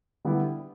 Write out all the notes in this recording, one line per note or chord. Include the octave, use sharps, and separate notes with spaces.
D3 G3 B3 E4 G4